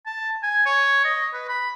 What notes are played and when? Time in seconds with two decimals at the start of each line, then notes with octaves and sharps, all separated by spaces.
0.06 A5
0.43 G#5
0.66 C#5
1.05 D#5
1.34 B4
1.49 B5